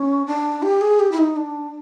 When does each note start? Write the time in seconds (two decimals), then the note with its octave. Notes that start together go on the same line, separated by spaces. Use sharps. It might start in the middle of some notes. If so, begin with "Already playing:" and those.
Already playing: C#4
0.26 D4
0.62 G4
0.81 G#4
1.00 G4
1.12 E4
1.18 D#4
1.36 D4